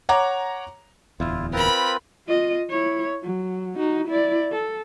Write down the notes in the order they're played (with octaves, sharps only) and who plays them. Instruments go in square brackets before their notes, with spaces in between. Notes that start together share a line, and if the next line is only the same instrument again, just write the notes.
[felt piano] C#5 F#5 A#5 D6
[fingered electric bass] D1 E2 [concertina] E4 F4
[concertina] C4 F4 B4 [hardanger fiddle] A#4 B5
[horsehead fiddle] F4 D#5
E4 C#5
F#3
D#4 F#4
E4 D5
A4